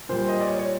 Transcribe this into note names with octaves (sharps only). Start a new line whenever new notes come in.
A#2 G3 C5
D#5
D5
C#5
C#5